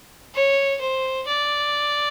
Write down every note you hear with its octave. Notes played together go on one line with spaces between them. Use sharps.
C#5
C5
D5